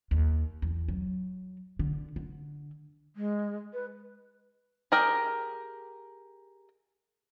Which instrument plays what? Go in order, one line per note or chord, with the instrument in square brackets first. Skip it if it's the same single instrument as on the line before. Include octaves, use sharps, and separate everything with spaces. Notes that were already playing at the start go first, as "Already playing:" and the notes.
[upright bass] D#2
E2
F#3
D3
D3
[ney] G#3
B4
[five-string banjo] G4 G#4 A#4 G5